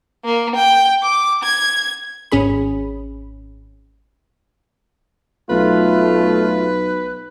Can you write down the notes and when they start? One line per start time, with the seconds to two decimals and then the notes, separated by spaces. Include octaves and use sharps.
0.25 A#3
0.56 G5
1.03 D6
1.43 G#6
2.32 G#1 C#4 G#4 B5
5.50 B1 A3 F4 B4